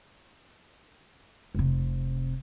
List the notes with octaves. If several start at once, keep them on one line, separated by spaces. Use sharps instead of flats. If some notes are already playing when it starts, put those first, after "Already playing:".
F1 C3